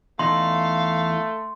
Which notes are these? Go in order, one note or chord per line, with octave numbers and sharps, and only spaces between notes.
E2 A3 D#4 F5 C6